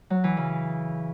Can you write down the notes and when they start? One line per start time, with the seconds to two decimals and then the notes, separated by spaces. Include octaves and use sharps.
0.10 F#3
0.24 E3
0.37 C#3